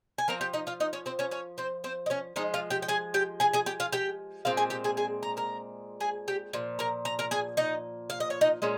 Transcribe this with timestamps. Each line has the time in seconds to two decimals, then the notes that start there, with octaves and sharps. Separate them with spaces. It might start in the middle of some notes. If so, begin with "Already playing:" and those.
0.18 G#5
0.28 F3 C4 A#4 A#5
0.41 G4 G5
0.54 D#4 D#5
0.67 F4 F5
0.80 D#4 D#5
0.93 C#4 C#5
1.06 C4 C5
1.19 C#4 C#5
1.31 C#4 C#5
1.58 C4 C5
1.84 C4 C5
2.06 D#5
2.10 C#4 C#5
2.36 F3 G#3 D#4 D#5
2.54 F4 F5
2.70 G4 G5
2.82 G5
2.88 G#4 G#5
3.14 G4 G5
3.40 G#4 G#5
3.53 G#4 G#5
3.66 G4 G5
3.80 F4 F5
3.93 G4 G5
4.45 A#2 G#3 C4 F5
4.57 G#4 G#5
4.70 G4 G5
4.84 G#4 G#5
4.97 G#4 G#5
5.23 A#5
5.37 A#4 A#5
6.00 G#4 G#5
6.28 G4 G5
6.53 A#2 F3
6.79 A#4 A#5
7.05 A#5
7.19 A#4 A#5
7.31 G#4 G#5
7.57 D#4 D#5
8.10 F5
8.20 D#5
8.30 C#5
8.41 D#4 D#5
8.62 A#2 G#3 C#4